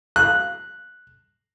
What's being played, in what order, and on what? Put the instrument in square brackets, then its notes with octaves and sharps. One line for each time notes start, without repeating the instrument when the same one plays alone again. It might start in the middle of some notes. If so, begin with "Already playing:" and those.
[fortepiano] F#6